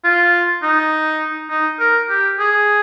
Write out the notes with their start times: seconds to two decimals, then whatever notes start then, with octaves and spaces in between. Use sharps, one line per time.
0.04 F4
0.63 D#4
1.50 D#4
1.79 A#4
2.09 G4
2.39 G#4